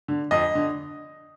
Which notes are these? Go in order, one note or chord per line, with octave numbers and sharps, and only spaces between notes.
D3
F2 D#5
D3